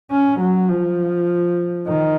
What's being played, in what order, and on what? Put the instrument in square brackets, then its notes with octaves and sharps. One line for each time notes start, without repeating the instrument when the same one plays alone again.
[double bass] C#4
F#3
F3
D#3